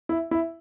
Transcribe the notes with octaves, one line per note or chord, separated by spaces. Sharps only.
E4
E4